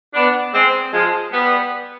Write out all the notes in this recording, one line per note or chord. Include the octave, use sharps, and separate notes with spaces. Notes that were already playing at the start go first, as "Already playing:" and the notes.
B3 D4
G#3 C4
F3 G#3
G3 B3